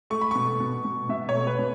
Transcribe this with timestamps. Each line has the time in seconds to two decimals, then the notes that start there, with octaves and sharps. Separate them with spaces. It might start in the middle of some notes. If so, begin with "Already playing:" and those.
0.10 A3 C#6
0.21 B5
0.31 B2 C#6
0.60 B2
0.85 B2
1.09 B2 E5
1.29 C#5
1.35 A3
1.47 B4
1.59 B2